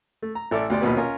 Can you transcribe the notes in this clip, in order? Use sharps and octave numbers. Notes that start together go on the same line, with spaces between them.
A3
A#5
A1 A4 D5 E5 D6
D2 B2 G4 D5 C6
A#1 D#2 B2 B4
C#4 F4 A#4